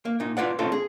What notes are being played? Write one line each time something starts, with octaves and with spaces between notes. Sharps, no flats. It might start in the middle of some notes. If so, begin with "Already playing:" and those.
A#3
A#2 D#4
F4 B4 D5 F#5
A3 C4 C#4 D#4 F4 A4
G#4